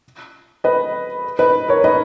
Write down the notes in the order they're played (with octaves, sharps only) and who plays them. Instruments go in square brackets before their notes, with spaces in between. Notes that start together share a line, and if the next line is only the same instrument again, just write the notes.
[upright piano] B4 D#5
B4 D#5
A#4 C#5
B4 D#5